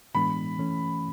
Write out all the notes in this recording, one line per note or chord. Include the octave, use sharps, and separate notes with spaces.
A2 E3 G#3 B3 D4 B5
E3 A3 C#4